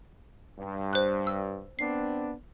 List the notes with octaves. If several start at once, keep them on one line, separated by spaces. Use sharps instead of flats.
G2
C5 F#6
E6
B3 C4 D4 C7